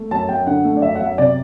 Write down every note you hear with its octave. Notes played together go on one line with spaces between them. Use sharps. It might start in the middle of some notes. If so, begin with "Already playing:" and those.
Already playing: A3
F#2 A5
F#2 G5
D3 F#5
A3
D5
F#2 E5
F#5
F#2 E5
C3 D5